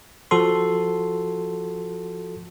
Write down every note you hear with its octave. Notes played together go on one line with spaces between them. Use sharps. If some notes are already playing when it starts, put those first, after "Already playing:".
F3 F#4 A4 C6